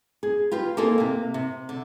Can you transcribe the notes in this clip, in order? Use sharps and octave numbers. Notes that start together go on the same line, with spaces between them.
G#4
F4 G4 B4
A#3 D#4 A4 C5 G#5
C3 A#3
C3
D3